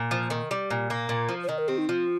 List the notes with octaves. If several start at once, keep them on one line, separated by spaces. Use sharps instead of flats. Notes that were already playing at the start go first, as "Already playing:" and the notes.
Already playing: A#2
F3
D#3
G3
A#2
A#3
A#2
F3
C5
D#3 D#5
A#4
C4 G4
D#4
F3 F4